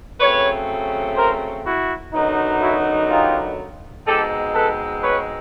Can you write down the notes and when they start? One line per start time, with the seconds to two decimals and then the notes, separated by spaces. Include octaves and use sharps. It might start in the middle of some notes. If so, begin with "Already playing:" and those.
0.20 C#3 F#3 A3 C4 B4 C#5
1.16 A#4 C5
1.65 E4 F#4
2.13 F#2 D3 F#3 B3 D#4
2.61 E4 F#4
3.10 F4 G4
4.07 B2 G#3 C4 D#4 G4 A4
4.54 A4 B4
5.02 B4 C#5